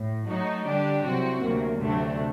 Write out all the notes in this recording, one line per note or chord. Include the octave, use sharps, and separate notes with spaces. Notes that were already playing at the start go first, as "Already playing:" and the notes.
Already playing: A2
F#3 A3 D#4 F#4
D3 G3 D4 G4 D5
C2 C3 F#3 C4 F#4
D2 C3 F#3 A#3
D2 C3 F#3 A3 D4